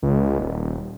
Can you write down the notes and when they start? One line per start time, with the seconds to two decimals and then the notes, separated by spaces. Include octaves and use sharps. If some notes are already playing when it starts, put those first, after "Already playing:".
0.03 C#2
0.39 D#1